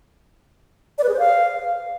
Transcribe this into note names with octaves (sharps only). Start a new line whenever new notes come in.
D5
B4
G#4
C5
F5